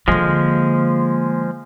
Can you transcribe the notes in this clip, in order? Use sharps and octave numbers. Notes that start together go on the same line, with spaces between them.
D3 F3 G#3 A#3